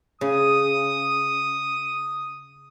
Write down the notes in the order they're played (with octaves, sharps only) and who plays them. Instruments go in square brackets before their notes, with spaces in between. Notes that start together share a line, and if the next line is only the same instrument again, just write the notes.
[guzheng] C#3 [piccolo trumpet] D#6